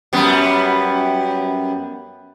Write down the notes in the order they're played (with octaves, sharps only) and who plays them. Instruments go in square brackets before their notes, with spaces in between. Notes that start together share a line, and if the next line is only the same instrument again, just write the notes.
[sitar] F#2 G3 B3